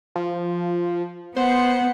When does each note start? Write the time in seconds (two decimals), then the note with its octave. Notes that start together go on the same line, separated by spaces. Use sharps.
0.16 F3
1.36 B3 C5 F#5